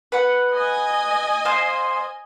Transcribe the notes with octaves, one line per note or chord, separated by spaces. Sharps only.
B4 F#5
D#5 G#5
C5 F5